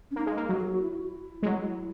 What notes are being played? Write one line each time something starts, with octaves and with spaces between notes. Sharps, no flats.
C#4
A#3 D#4
G#3
A#3
F#3 F#4
G#4
F#4
E4
F#4
E4
G#3
F#3